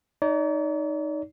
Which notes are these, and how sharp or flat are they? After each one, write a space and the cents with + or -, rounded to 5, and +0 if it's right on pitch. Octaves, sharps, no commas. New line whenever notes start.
D#4 -5 D5 -45